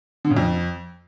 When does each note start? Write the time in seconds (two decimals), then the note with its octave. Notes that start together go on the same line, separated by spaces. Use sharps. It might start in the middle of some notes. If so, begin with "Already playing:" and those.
0.25 D3
0.31 C#3
0.37 F2